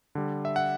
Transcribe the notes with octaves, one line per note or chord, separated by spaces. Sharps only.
D3 G3
E5
F#5